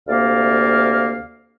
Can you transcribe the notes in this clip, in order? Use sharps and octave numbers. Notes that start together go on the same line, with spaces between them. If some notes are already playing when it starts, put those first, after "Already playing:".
D2 C3 A#3 D5 F5